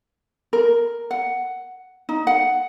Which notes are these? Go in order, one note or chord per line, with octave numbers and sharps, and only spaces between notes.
A#4
F#5
D#4
F#5